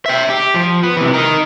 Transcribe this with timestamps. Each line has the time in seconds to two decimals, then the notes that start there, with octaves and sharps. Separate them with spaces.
0.06 E5 G5
0.30 G4
0.54 F3
0.83 B3
0.97 C3 E3
1.14 D#4 A#4